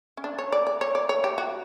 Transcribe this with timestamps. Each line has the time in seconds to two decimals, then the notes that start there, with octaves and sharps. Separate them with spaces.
0.17 C#4
0.24 D4
0.39 C#5
0.52 D5
0.67 D5
0.81 C#5
0.95 D5
1.09 C#5
1.24 G4
1.38 F#4